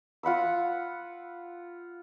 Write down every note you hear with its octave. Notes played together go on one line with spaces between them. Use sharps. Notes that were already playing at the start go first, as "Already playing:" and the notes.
F4 F#5 B5 E6